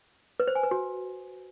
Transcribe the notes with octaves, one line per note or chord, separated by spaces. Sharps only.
B4
C5
G#5
B4
F#4